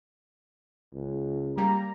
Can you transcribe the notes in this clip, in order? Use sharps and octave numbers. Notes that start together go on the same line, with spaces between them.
C#2
G3 A#3 A#5